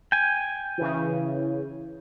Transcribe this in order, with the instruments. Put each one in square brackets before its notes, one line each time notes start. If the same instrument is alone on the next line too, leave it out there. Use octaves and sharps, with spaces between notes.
[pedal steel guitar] G5 G#5
[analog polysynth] C#3 E3